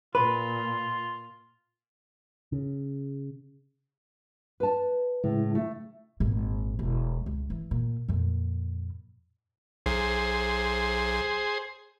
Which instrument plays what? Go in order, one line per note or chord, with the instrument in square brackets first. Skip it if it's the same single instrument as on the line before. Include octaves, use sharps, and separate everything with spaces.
[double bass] A#2 [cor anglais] F4 [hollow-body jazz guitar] B4
[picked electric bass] C#3
[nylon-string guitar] B4 A5
[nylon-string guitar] A2 [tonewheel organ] C#3 G#3 E4
[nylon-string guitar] A3
[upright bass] G#1 A#2
E1
C#2
E3
A#2
F2 A#2
[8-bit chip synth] B1 [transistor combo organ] G#4 C5